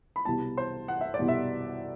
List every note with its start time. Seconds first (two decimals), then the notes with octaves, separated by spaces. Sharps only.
0.16 B5
0.25 C2 B2 G3 A5
0.57 C5
0.88 F#5
1.01 E5
1.14 D5
1.19 C2 B2 G3
1.28 E5